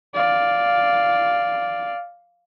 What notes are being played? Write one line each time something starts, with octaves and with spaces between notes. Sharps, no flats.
D5 F5